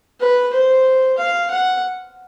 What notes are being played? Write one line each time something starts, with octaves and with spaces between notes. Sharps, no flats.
B4
C5
F5
F#5